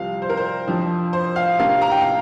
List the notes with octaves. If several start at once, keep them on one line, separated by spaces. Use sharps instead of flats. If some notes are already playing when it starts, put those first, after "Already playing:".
Already playing: C2 C3 F3 C4 F5
C5
A#4
C5
F2 F3 D4
C5
F5
C3 A#3 D4 F5
A#5
G5
F5